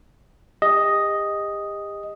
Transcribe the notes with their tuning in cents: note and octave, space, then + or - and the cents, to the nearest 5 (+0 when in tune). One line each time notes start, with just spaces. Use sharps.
G4 +40 D#5 +0